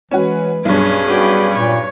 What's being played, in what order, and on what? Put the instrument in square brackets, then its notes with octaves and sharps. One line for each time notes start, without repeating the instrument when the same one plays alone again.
[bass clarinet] E3 [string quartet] G#3 B4 [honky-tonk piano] C#4 F#4
[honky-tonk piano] B1 G2 [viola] C#4 G#4 [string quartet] D4
[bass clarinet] F#4 [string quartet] B4 D5 G5
[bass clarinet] A#2 [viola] C#5